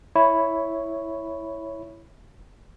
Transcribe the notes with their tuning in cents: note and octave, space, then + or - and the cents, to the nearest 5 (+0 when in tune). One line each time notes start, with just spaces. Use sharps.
E4 +0 C#5 +0 B5 +0